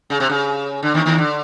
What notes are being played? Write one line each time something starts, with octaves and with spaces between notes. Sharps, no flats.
C#3
C3
C#3
D3
D#2 D#3
D#2 D#3
D3